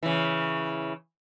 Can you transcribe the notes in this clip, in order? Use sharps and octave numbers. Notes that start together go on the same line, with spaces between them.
C#3 E3